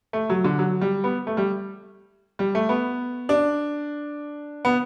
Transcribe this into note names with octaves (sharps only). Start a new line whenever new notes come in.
A3
F#3
D3
F#3
G3
B3
A3
G3
G3
A3
B3
D4
B3